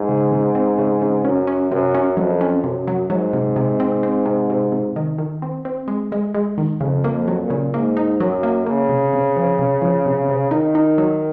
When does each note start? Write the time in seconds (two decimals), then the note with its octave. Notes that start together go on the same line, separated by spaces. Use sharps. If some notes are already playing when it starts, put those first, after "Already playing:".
Already playing: G#2
0.09 C#3
0.32 C#3
0.55 C4
0.79 C#3
1.02 C#3
1.25 F#2 C#4
1.47 C#4
1.71 F#2 C3
1.95 C#4
2.17 F2 F#3
2.41 C#4
2.63 F#2 C3
2.88 F#3
3.10 G#2 F#3
3.33 C3
3.56 C3
3.80 C4
4.03 C4
4.26 C3
4.50 C3
4.72 C3
4.96 D#3
5.18 D#3
5.42 C4
5.65 C4
5.88 G#3
6.12 G#3
6.35 G#3
6.58 D#3
6.81 F2 C#3
7.04 A#3
7.12 F2
7.28 F#3
7.43 A#2
7.50 C#3
7.73 G#2 A#3
7.97 D#4
8.20 F#2 F#3
8.43 A#3
8.66 C#3 A#3
8.89 C3
9.13 C3
9.37 F3
9.59 C3
9.82 F3
10.06 C3
10.29 C3
10.51 D#3 D#4
10.75 D#4
10.98 F#3